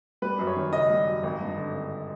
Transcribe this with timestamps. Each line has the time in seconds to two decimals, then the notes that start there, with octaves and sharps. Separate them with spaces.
0.22 G3 B4
0.39 F#2
0.47 C#5
0.56 D#3
0.73 F#1 D#5
0.90 G3
1.07 F#2
1.23 G#1
1.40 G2
1.57 D3
1.73 G#1